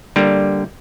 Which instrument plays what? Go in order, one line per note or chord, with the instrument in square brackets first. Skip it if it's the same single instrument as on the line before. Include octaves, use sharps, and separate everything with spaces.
[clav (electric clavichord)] D3 G3 A#3